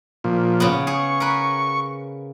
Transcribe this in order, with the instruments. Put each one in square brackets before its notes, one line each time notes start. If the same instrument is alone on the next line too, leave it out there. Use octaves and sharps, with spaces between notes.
[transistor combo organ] A#2 F3
[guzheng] C#3 B3
[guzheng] G#4 [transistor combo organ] C#6
[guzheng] A#4 B4